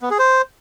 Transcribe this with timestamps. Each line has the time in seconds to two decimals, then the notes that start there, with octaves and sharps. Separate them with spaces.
0.02 B3
0.10 G#4
0.19 C5